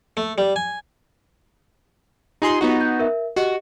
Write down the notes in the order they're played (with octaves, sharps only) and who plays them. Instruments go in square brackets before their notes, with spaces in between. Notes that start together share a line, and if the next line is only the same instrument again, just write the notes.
[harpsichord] A3
G3
G#5
[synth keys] D#4 G#4 C6 [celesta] F4 G4
[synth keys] B3 D#4 F#4
[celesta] G6
A#4 E5
[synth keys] F#4 [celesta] G4 D#5